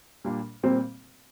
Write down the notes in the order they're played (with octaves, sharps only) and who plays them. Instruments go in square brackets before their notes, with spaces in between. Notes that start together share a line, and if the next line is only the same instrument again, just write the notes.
[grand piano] A#2 G3 A#3 D4
[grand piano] A#2 G3 A#3 [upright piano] C4